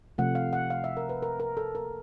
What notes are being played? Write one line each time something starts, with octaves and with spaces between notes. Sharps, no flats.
C3 F3 A3 F#5
F5
F#5
F5
E5
A#4
B4
A#4
A#4
A4
A#4